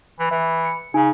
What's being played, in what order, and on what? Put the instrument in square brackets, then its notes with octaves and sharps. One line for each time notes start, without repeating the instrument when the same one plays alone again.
[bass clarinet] E3
[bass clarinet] E3 [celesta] E5
[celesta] C#7
[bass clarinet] C#3 [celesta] D#4 G#5